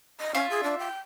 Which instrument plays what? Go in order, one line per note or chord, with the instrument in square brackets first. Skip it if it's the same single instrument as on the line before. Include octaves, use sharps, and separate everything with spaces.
[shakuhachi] D#5
[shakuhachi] C#4 [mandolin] F4 E5
[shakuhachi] G#4
D4
G5